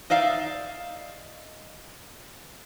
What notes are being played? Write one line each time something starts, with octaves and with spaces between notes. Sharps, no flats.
D#4 D5 E5 F5